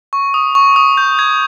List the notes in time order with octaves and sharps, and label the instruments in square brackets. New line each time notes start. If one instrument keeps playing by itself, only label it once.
[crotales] C#6
D#6
C#6
D#6
G6
G#6